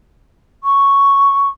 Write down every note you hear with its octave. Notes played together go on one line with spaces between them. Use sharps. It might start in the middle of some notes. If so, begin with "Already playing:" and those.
C#6